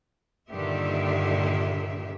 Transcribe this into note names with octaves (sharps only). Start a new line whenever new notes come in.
G2 A#2 D3 D#3 G4 E5